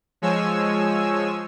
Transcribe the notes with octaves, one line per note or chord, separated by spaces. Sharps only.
F3 G#3 C#5 G#5 E6